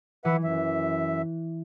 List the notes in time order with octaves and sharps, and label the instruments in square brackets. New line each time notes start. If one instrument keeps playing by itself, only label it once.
[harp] E3 [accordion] B4 E5 F#5
[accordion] F#2 E5